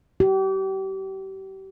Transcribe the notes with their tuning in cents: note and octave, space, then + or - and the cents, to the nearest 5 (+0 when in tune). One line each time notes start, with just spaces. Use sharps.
G4 -35